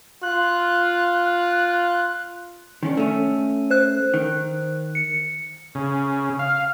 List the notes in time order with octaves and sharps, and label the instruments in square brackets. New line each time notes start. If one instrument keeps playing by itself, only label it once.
[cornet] F4 [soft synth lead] F#6
[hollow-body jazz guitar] D#3 C#4 D4
A3 C#4
[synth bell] C5 F#6
[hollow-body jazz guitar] D#3
[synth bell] C#7
[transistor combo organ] C#3
F5